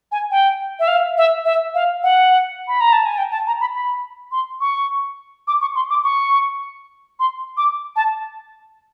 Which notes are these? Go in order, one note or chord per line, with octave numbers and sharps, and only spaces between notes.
G#5
G5
E5
F5
E5
E5
F5
F#5
B5
A#5
A5
G#5
G5
A5
A#5
B5
B5
C6
C#6
D6
C#6
C6
D6
C#6
C6
D6
A5